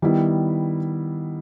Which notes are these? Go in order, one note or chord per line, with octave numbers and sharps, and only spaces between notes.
D#3 G3 B3 E4